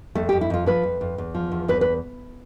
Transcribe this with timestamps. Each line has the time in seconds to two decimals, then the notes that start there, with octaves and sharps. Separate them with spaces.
0.15 F2 A3
0.29 F2 G4
0.41 E4
0.50 F2 F4
0.66 F3 B4
0.83 F2
1.01 F2
1.18 E2
1.35 F3
1.52 E2
1.68 E2 B4
1.81 B4